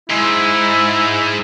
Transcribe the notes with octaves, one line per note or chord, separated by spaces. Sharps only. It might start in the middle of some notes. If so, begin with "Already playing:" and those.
G#2 E4